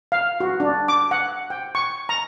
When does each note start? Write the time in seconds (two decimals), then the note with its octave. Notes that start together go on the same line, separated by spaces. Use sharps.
0.12 F5
0.40 F#4
0.60 D4
0.88 D6
1.11 F#5
1.50 G5
1.75 C#6
2.09 A#5